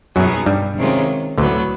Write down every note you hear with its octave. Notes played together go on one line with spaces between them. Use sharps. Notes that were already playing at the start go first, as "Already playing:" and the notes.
F#2 B2 F#3 G3 B3 D#4 G#4
G2 G3
C3 D#3 G#3 C#4 F4
D2 A2 D3 F#3 B3